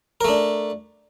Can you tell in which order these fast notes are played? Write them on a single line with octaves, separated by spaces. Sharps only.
A#4 A3 D4